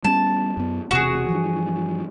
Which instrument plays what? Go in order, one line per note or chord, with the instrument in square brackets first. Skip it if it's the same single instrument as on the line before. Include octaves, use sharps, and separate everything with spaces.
[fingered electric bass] G3 B3 C#4 [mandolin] A5
[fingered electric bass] F#2 B3
[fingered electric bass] E1 C3 [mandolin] F#4 G#4
[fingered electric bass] G2 E3 F3